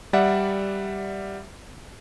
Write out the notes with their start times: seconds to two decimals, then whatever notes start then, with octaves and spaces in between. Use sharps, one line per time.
0.13 G3 D5 E5 F#5